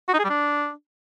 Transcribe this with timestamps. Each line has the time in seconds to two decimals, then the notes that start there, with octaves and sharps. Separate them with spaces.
0.08 F#4
0.14 D#4
0.19 G#4
0.24 G3
0.30 D4